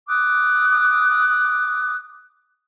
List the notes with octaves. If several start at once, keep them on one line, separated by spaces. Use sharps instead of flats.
D6 D#6 F#6